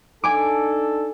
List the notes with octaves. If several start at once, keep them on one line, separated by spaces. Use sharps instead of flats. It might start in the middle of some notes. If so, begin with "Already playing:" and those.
D4 D#4 A4 G#5 D6